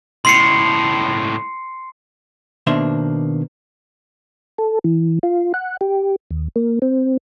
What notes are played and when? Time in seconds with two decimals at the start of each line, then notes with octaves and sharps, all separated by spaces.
0.25 C#2 A2 C6 C7 C#7
2.67 B2 D#3 A#3 D4 C5 E5
4.58 A4
4.84 E3
5.23 F4
5.54 F#5
5.81 G4
6.31 D#2
6.56 A#3
6.82 C4